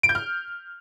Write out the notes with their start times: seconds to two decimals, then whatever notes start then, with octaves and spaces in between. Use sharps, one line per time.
0.03 D7
0.09 G6
0.15 F6